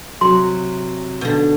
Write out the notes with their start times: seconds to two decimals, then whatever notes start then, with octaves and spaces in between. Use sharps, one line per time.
0.21 C3 F#3 C6
1.21 B2 D3